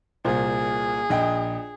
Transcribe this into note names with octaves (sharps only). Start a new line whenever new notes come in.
C2 A#2 G#4 C5
A#1 D#5 G5